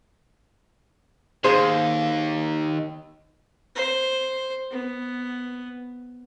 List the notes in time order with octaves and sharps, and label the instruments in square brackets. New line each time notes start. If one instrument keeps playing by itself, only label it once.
[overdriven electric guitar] D#2 [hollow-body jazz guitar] G#4 C5
[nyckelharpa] C5
B3